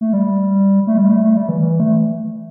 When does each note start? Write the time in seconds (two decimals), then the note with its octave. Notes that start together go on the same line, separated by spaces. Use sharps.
0.01 A3
0.13 G3
0.87 A3
0.98 G3
1.09 A3
1.24 A3
1.37 G3
1.49 E3
1.61 E3
1.80 A3